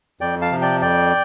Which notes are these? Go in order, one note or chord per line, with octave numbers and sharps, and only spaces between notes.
F2 D5 G5
F5 A5
C3 F3
D5 G5
F2 D5 G5